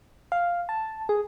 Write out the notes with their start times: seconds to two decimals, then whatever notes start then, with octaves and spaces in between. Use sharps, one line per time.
0.32 F5
0.69 A5
1.09 G#4